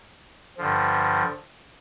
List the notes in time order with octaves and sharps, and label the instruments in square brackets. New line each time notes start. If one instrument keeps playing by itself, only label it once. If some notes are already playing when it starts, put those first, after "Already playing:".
[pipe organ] G2 D3 F3